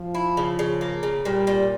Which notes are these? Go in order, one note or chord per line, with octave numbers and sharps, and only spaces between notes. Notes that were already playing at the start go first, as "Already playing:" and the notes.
Already playing: F3
E4
C#3
C#3
A#3
C#3
A#2 G3
A#2